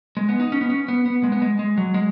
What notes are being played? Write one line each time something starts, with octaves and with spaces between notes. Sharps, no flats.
G#3
B3
D#4
C#4
B3
C#4
B3
B3
G#3
B3
G#3
G#3
F#3
G#3